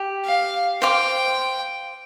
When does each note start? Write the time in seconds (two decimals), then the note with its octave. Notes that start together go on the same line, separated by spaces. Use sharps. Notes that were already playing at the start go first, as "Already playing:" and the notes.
Already playing: G4
0.25 F5
0.82 C5 F5 G5 D6